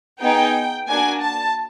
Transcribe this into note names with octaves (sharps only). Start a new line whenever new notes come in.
B3 D#4 G#4 G5
A#3 D4 F#4 G#5
A5